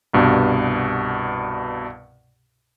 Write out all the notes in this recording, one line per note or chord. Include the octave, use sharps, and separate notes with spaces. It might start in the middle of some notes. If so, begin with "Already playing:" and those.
C2 G2 B2